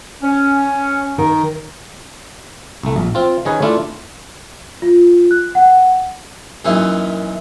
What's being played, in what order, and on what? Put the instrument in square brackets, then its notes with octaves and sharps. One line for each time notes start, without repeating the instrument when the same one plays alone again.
[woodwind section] C#4
[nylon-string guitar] D#3
[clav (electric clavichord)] C2 A3
A#1
C4 F4
D#3 C#4 G#4 B4 C#5
A3 D4 E4 F4
[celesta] F4
F#6
F#5
[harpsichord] F#2 A#2 D#3 E3 E4